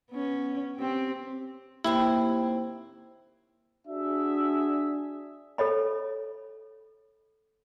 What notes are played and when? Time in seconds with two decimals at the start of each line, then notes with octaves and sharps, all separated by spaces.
0.11 B3 C#4
0.76 C4 G4
1.84 D#2 A2 A#3 C4 E4 G4
3.88 D4 F#4 G#4 E5
5.58 A4 C#5 D#5 B5